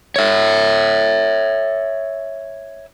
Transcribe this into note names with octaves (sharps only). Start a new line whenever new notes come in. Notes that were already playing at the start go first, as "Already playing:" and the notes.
C#5 E5